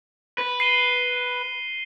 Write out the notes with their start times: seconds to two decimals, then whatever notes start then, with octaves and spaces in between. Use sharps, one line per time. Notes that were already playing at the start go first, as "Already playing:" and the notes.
0.38 B4
0.60 C7 D#7 G7